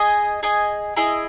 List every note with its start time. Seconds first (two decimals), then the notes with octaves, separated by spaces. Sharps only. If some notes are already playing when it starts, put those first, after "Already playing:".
Already playing: G#4 D#5 G#5
0.43 G#4 D#5 G#5
0.96 E4 G#4 D#5